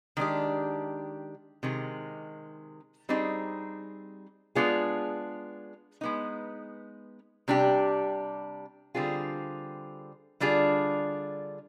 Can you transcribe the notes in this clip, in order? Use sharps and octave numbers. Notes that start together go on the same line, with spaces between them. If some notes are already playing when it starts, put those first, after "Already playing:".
D#3 G#3 D4 G4
C3 D#3 G#3
G3 C4 D#4 G#4
G#3 B3 D4 F4 G#4
G#3 B3 D#4
C3 G3 D4 G4
D3 G3 C4 F4 G#4
D3 G3 D4 F4 G#4